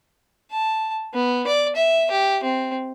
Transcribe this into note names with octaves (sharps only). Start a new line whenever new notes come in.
A5
B3
D5
E5
G4
C4